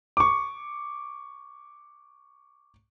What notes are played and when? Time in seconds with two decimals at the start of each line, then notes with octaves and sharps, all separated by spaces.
0.17 C#6 D6